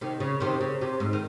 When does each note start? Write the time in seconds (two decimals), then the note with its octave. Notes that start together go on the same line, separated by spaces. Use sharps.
0.01 C3 D#3
0.20 C#3
0.40 C3 D#3
0.61 C#3
0.81 C3
1.00 G#2
1.13 D#3